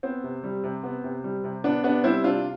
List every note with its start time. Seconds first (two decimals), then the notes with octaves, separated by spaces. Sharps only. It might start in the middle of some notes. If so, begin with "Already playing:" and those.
0.03 B3 C4
0.24 C3
0.44 G3
0.64 C3
0.84 B3
1.04 C3
1.24 G3
1.44 C3
1.64 B3 D4
1.84 C3 B3 D4
2.04 G3 C4 E4
2.24 C3 D4 F4